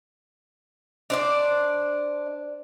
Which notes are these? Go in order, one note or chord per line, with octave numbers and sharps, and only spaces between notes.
D4 C5 D5